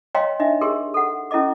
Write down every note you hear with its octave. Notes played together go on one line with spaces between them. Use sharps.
C#5 D#5 F5 G5 A#5 C6
D4 D#4 D#5 E5
G4 G#4 A#4 C6
A4 F#5
C#4 E4 A4 D#5 D6